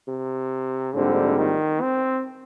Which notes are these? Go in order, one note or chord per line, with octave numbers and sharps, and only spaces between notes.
C3
A#1 G#2 D3 G3 C4
D#3
C4